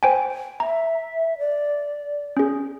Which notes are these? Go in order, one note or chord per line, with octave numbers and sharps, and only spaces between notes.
C5 G5 G#5
E5 A#5
D5
C#4 G#4